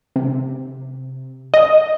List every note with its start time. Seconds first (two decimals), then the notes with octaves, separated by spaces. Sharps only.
0.16 C3
1.54 D#5